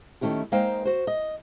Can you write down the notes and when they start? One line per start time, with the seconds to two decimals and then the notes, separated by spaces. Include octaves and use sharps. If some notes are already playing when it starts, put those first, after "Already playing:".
0.21 D#3 A3 C#4 E4 G4
0.52 G#3 A#3 D#4 C5 F5 G5
0.85 F#4 C5
1.07 D#5